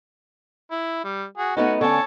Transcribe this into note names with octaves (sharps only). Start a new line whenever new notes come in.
E4
G3
F#4 G#4
A3 B3 C#4 D#4 F#4
D3 C#4 A4 C#5 A5